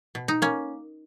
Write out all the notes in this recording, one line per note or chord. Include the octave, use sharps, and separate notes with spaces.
B2
D#4
A#3 C#4